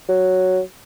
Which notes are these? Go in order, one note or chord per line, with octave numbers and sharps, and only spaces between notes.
F#3